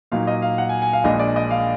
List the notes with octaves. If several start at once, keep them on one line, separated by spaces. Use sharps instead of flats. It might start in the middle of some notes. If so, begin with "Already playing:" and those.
A#2 F#3 A#3 D#4 F5
D#5
F5
F#5
G#5
G#5
F5
A#1 A#2 G#3 D4 D#5
D5
D#5
F5